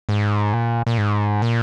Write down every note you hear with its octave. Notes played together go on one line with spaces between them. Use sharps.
G#2
A#2
A#2
G#2
A#2